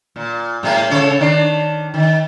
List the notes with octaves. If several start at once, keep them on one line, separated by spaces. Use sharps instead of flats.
A#2
A2 G#3 A#3
C#3 A4 C#5
D#3 D4
D#3